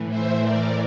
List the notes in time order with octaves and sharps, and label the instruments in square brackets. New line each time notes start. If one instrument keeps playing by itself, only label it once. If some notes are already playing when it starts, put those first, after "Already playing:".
Already playing: [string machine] A2 E3
C5 E5
A#4 D5